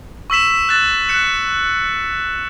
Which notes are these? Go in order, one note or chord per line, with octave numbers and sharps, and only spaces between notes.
C#6 E6 B6 E7
F#6 A6 E7
F#6 C#7 E7